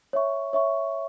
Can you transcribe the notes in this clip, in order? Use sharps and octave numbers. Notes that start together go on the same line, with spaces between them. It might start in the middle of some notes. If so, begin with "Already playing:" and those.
C#5 E5 C#6
C#5 E5 C#6